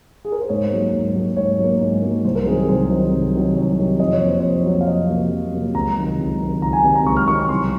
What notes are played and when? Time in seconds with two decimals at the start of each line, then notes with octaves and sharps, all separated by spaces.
0.25 G#4
0.32 A#4
0.41 C5
0.49 G#2 C#5
0.71 F#3 A#3
0.93 G#2
1.16 F#3 A#3
1.36 G#2 C#5
1.59 F#3 A#3
1.81 G#2
2.02 F#3 A#3
2.24 C2 C5
2.35 A#4
2.46 C3 D#3 F#3 G#4
2.58 G#4
2.69 C2 C5
2.90 C3 D#3 F#3
3.12 C2
3.33 C3 D#3 F#3
3.55 C2 C#5
3.78 C3 D#3 F#3
3.99 F2 D#5
4.13 C#5
4.21 C3 F#3 A#3 C5
4.39 F2 C#5
4.65 C3 F#3 A#3
4.81 F5
4.87 F2 D#5
5.09 C3 F#3 A#3
5.31 F2
5.52 C3 F#3 A#3
5.74 C#2 A#5
5.97 C3 D#3 F#3
6.19 C#2
6.40 C3 D#3 F#3
6.62 C#2 A#5
6.73 G#5
6.84 C3 D#3 F#3 G#5
6.95 A#5
7.06 C#2 C#6
7.17 F6
7.28 C3 D#3 F#3 C#6
7.39 C#6
7.49 C2 C6